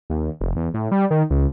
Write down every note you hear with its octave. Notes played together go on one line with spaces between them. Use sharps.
D#2
F1
E2
A2
G3
D#3
C#2